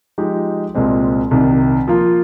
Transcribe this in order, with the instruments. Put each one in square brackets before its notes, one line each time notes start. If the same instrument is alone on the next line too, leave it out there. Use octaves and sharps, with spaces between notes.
[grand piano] F3 G#3 D#4 G4
C2 A#2 G#3 C4
C2 C3 D#3
F3 A#3 F4